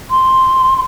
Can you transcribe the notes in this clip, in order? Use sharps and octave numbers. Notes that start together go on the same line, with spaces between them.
C6